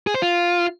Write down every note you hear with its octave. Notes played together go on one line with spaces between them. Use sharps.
G#4
C5
F4